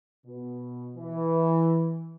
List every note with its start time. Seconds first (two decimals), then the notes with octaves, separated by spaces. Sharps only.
0.25 B2
0.95 E3